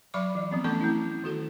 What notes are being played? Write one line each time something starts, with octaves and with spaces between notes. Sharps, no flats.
F#3 D5 B5 C#6 D6
E3
F3 B3 C4
E3 A3 C#4 A4 A5 C#6
A3 C4 E4
D#3 F#4 A4